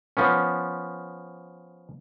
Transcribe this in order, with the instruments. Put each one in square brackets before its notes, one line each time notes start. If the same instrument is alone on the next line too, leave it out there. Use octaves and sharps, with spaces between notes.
[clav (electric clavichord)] F3 B3 C#4